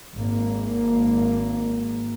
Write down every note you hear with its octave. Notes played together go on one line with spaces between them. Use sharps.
G#1 A#3